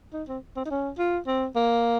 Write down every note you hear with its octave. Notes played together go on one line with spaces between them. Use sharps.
D#4
C4
C4
D#4
C#4
F4
C4
A#3